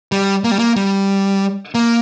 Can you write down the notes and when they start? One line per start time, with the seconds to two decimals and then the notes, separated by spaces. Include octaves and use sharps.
0.12 G3
0.44 A#3
0.51 G3
0.59 A#3
0.76 G3
1.75 A#3